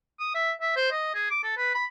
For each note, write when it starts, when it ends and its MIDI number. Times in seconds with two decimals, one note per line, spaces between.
0.20 0.34 87
0.35 0.51 76
0.61 0.72 76
0.76 0.91 72
0.91 1.10 75
1.14 1.28 68
1.31 1.40 86
1.43 1.52 69
1.57 1.73 71
1.75 1.85 83